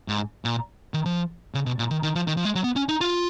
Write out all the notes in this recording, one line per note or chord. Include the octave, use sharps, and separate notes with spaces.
G#2
A#2
D#3
F3
C#3
B2
A#2
D#3
D#3
F3
D#3
F3
G#3
F#3
B3
C#4
D#4
F4